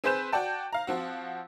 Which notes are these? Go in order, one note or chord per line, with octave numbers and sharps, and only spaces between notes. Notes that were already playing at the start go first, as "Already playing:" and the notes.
C4 G#4 B4 C5 G6 E7
F#4 D5 G5 A5
F5 A#5
F3 C4 F#4